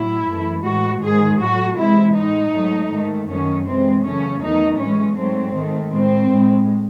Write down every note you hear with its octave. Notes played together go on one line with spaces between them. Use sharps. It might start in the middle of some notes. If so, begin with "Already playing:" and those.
Already playing: A2 F#3 E4
F#2 E3 A3
A2 E3 G#3 F#4
G#2 D#3 G#3 G#4
A2 F#3 A3 F#4
C3 E3 G#3 E4
A2 G#3 D#4
G#2 F#3 A3
G#2 D#3 A3
F#2 D#3 F#3 A3 C#4
C3 E3 G#3 C4
F#2 C#3 E3 A3 C#4
E2 D#3 F#3 A3 D#4
A2 E3 G#3 C#4
G#2 F#3 A3 C4
G#2 D#3 A3
A2 G#3 C4
A2 G#3